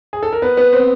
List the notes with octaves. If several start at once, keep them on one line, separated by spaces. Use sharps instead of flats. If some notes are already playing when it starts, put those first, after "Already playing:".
G#4
A4
A#4
B3 B4
B3 B4
C4 C5